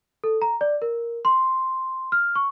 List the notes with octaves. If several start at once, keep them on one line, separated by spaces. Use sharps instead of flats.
A4
A#5
D5
A#4
C6
F6
C#6